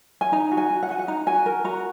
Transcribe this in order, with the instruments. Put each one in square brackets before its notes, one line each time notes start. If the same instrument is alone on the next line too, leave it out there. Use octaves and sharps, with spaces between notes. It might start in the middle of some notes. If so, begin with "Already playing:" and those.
[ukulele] G#5
D#4 A#5
F#4
G#5
F#4
F#5
F#4 G#5
F#5
D#4 A#5
F#4 G#5
A#4
F#4 A#5